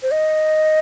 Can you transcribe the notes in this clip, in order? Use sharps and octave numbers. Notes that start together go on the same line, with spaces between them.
C5
D#5